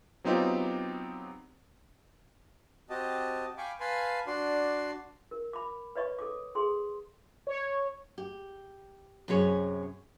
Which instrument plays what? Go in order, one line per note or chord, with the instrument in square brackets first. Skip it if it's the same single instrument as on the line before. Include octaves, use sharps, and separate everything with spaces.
[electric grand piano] F#3 B3 C4 D#4 F4 G4
[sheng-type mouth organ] C4 F#4 G4 D#5 A5
F5 G5 G#5 B5 C#6 D6
B4 F5 G#5 A5 B5 C6
D4 F#4 D5 C6
[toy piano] A#4
B5 D6
B4 C#5 D#5 C#6
A4 D6
G#4 A4 C6
[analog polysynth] C#5
[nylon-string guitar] G4
F#2 C3 G#4 C#5